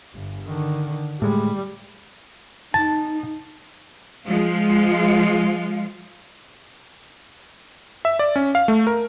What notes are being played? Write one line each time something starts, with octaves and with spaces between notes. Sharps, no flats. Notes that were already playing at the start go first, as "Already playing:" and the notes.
G1
D3 D#3
A2 G3 G#3
D#4 A5
F3 G#3 F4
E5
D5
C#4
F5
A3
A#4